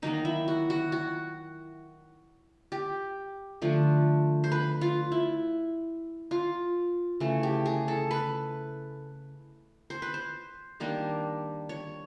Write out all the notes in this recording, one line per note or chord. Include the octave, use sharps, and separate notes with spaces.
D#3 F#3 A#3 D#4
E4
F#4
F#4
F#4
G4
D3 F3 A3
C5
B4
F4
E4
F4
C#3 E3 A3
G4
G#4
A4
B4
C5
B4
C5
D#3 G3 A#3 D4
C#5